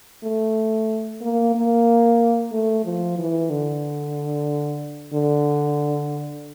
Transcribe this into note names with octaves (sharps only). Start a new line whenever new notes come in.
A3
A#3
A#3
A3
F3
E3
D3
D3